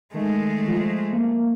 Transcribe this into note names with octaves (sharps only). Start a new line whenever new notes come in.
D#3 G#3 A3
F3
A#3